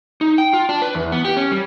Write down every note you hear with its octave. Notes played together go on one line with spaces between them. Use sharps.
D#4
G5
F4
D4
B4
E2
B3
G4
C#4
G3